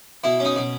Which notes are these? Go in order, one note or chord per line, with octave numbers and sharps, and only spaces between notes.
B2 E4
C#4 D#4
B2